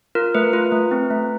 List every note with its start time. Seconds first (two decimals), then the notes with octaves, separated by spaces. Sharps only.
0.15 F4 A#4
0.35 A3 B4
0.53 F4 B4
0.72 A3
0.91 C4
1.11 A3